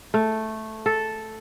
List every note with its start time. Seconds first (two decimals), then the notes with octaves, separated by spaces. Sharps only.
0.14 A3
0.86 A4